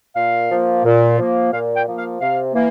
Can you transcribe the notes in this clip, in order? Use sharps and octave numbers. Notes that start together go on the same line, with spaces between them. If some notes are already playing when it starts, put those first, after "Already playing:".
A#2 F5
F3 A#3
A#2
F3 A#3
A#2 F5
G5
F3 A#3
F5
C3 F5
E3 A#3